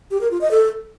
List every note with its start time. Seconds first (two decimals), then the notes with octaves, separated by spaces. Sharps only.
0.11 G4
0.21 A#4
0.31 F4
0.41 D#5
0.51 A4